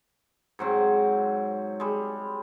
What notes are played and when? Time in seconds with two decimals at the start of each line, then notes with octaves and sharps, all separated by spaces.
0.59 G#2 F#3 C4
1.80 G3 G#3